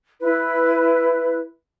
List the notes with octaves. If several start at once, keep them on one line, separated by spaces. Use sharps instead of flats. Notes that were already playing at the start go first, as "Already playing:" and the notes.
E4 B4